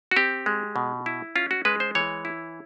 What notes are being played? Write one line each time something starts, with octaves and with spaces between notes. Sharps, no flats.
F#4
C4 G4
G#3
B2
E4
C#4 F4
F#4
G#3 B4
C5
E3 C#5
E4